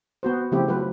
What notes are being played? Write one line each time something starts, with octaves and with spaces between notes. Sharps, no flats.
B3 F#4 C5
C#3 F3 A3 C4 E4 G4
F#3 F4 B4